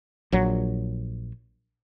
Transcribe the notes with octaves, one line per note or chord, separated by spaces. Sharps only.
A#1 F#3